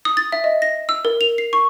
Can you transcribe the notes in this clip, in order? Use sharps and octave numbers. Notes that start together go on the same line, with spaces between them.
D#6
A6
E5
D#5
A#6
E6
A#4
F7
C7
C#6